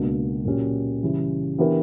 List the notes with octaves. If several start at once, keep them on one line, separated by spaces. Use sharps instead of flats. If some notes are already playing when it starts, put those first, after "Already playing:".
Already playing: C#2 B2 A#3 D4
A#2 F#3 C#4 G4
C#3 E3 G3
E3 B3 D4 G4 A#4